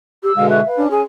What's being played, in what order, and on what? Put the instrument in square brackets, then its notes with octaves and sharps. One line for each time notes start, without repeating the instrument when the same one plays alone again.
[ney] G4 [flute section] E6
[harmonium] B2 D3 G#3 [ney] F5
[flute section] F#4 C#6 F#6 [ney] E5
[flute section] B4 F5
[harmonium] C#4 [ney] D4
[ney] G#4 [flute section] G#5